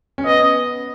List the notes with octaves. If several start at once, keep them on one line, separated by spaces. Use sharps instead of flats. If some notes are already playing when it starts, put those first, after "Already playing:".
C#4
B3 D#5